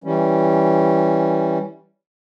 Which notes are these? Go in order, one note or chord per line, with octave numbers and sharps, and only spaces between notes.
E3 G3 C#4